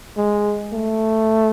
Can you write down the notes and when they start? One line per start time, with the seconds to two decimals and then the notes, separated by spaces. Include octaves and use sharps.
0.17 G#3
0.73 A3